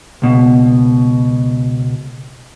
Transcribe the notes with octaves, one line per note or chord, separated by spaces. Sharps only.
C#2 B2